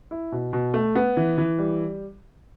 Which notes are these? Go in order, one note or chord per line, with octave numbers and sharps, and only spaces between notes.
E4
B2
B2
A3
B3
E3
E3
G3